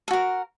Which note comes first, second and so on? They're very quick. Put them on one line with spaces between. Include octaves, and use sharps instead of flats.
A4 F#4 A#4